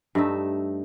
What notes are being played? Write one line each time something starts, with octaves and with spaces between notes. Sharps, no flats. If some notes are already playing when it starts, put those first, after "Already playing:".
G2 A3 D#4 E5